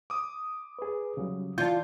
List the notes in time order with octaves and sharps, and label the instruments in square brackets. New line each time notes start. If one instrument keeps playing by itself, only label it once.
[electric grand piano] D6 D#6
[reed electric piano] G#4 B4
C#3 F#3 G3
[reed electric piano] E3 D5 A5 [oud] F4 [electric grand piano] G6